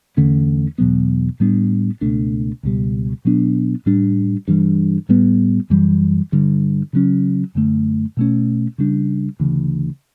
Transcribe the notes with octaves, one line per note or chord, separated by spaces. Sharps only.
E2 D3 A3 C#4
E2 B2 F#3 B3
A2 G3 B3 D4
C#2 B2 A3 D4
C#2 B2 G3
B2 F#3 B3 D4
A2 G3 D4
G2 E3 G3
A2 G3 B3
F#2 E3 G3
G2 D3 G3
C#3 F#3 C#4
F#2 D3 A3
B2 A3 C#4
C#3 G3 D4
D2 C#3 E3